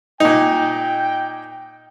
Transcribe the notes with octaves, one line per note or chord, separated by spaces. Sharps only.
A#2 D#4 G5